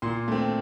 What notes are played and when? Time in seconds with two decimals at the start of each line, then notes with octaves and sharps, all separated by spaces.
0.02 A#2 C6
0.28 A3 C4